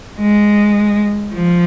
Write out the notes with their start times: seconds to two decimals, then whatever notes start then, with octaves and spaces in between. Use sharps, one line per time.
0.20 G#3
1.33 F3